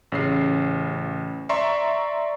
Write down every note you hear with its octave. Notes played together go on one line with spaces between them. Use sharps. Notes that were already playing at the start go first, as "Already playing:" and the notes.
A1 C#3 C7
D5 E5 A#5 C6 C#6